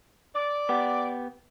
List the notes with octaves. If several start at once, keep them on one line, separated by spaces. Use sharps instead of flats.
D5
B3 G4